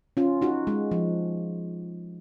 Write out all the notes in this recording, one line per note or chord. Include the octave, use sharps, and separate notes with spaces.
C#4 F4
D#4 F#4
G#3
F3